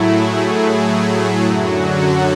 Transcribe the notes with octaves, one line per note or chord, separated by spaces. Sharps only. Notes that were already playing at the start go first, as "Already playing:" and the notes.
Already playing: A2 F#3 A3 E4 G#4
E4
F#2 D3 F#3 F#4
A4